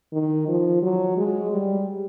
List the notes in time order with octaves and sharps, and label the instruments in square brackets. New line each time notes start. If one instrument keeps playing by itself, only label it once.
[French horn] D#3
F3
F#3
G#3
G3